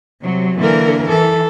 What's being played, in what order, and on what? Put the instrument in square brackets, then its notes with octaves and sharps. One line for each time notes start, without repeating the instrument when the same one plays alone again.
[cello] C3 [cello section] F#3
[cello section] D3 A#4 [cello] E3 A#3
[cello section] E3 [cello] A4